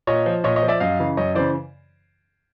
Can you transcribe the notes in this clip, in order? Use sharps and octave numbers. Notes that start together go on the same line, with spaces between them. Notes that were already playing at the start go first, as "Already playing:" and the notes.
A#2 C#5 D#5
F3
A#2 C#5 D#5
C#5 D#5
F3
D5 E5
F#2 D#5 F5
C#3 E3
F#2 C#5 D#5
C#3 E3 C5 D5